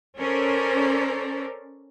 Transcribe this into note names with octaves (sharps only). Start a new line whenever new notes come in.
C#4 A4 A#4 C5 D5